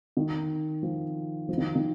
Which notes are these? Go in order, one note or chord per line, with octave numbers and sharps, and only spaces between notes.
D#3
F3
F3
D#3
D#3